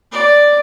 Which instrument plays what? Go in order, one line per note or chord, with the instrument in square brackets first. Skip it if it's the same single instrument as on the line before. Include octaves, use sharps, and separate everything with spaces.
[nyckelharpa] D5